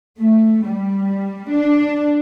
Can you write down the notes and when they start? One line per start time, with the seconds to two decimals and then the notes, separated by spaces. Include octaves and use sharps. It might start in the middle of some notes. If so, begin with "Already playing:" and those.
0.19 A3
0.65 G3
1.50 D4